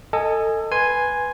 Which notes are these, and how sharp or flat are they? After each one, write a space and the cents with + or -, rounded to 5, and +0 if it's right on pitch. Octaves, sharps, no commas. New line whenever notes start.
A4 +25 D#5 +0 G#5 +0
B4 +0 G#5 +0 C6 +0